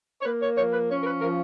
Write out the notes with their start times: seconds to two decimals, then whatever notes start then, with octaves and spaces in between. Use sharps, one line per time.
0.21 C#5
0.25 A#3 B4
0.42 C#5
0.57 F3 C#5
0.73 B4
0.90 C#4 C#5
1.02 A#4
1.06 B4
1.22 F3 A#4